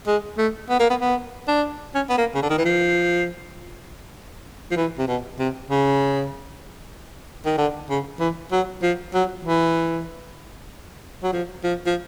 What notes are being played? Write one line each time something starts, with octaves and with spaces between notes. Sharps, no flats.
G#3
A3
B3
A#3
B3
B3
D4
C#4
B3
A#3
C#3
D3
D#3
E3
F3
F3
E3
C3
B2
C3
C#3
D#3
D3
C#3
E3
F#3
F3
F#3
E3
F#3
F3
F3
F3